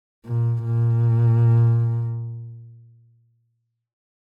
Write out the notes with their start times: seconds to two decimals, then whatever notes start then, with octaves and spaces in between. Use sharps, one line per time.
0.26 A#2
0.64 A#2